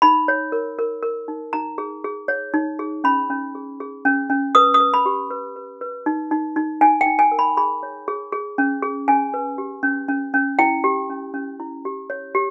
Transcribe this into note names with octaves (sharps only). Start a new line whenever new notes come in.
D#4 B5
C#5
A#4
A#4
A#4
D#4
D#4 A#5
G#4
G#4
C#5
D#4
G#4
C#4 B5
C#4
G#4
G#4
C#4
C#4
B4 D#6
D#6
B4
B5
G4
B4
B4
B4
D#4
D#4
D#4
D#4 G#5
G5
D#4
G#5
A#4
B5
G#4 B5
C#5
G#4
G#4
C#4
G#4
C#4 G#5
B4
G4
C#4
C#4
C#4
E4 G5
G4
C#4
C#4
E4
G4
C#5
G4